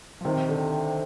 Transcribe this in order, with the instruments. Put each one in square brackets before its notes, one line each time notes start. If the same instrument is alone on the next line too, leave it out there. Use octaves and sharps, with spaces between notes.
[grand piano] F3
[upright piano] C3 [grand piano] D#3
[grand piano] D3